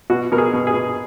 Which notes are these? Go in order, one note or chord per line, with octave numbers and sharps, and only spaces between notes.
B2 F#4
B2 A#4
G#4
B2
G#4
B2